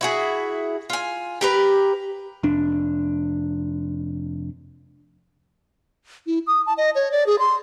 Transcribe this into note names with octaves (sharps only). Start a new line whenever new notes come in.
E4 F#4 G#4
F4 G#5
G4 A#4 B4
F1 D4
E4
D#6
A5
D#5
C#5
D5
G#4
C6